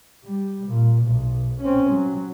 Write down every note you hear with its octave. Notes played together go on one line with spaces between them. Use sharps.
G3
A#2
B1
C4 C#4
F#3